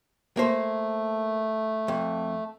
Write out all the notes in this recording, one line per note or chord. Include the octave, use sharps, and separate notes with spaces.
A3 A#3 C5
F2